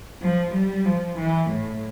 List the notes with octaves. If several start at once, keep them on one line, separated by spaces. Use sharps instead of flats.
F3
G3
F3
E3
A2